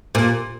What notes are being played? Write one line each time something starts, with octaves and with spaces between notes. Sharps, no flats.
A#2